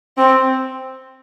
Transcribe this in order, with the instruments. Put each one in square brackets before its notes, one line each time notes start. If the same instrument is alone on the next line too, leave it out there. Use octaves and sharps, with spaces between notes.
[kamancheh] C4